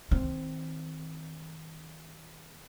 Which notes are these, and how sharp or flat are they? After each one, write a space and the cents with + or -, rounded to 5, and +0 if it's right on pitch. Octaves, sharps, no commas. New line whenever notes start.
D#3 +40 C4 +0